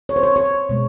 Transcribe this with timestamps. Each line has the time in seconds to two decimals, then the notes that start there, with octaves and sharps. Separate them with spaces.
0.09 C#5
0.16 C5
0.23 C#5
0.36 C#5
0.69 B2 G#3